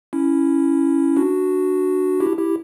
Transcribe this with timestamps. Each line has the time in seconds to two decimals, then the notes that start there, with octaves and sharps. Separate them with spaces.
0.13 C#4 E4
1.16 D4 F#4
2.20 E4 G4
2.38 E4 G4